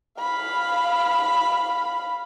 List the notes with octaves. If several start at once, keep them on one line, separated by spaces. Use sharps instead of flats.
F5 B5